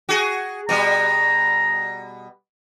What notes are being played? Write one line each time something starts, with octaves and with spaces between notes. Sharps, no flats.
F#4 G#4
B2 G3 A#5